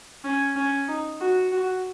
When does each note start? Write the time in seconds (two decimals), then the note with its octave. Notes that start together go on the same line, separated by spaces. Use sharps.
0.24 C#4
0.56 C#4
0.88 D#4
1.20 F#4
1.52 F#4